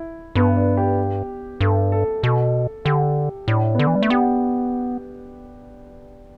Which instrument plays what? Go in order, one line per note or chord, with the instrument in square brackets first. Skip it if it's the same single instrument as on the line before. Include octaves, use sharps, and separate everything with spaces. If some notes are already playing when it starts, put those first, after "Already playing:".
Already playing: [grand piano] E4
[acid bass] G2 [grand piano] B3
[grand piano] D4
G4
[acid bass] G2 [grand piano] A4
[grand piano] A4
[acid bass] B2 [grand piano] A4
[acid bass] D3 [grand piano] G4
[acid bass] A2 [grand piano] D4
[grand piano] B3
[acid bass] D3 [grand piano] D4
[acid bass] E3
G3
A3
[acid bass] B3 [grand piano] G4